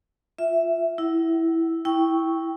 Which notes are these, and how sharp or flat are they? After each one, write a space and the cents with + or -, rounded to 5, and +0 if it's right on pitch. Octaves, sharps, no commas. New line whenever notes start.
F4 +0 E5 +0
E4 -5 F#5 +40
E4 -10 G5 +0 C#6 +0